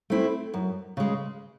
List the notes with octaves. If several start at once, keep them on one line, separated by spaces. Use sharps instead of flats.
A3 C4 E4
F#2
C#3 G#3